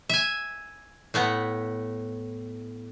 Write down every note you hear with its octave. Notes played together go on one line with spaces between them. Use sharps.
E5 G#5
A2 A3 B3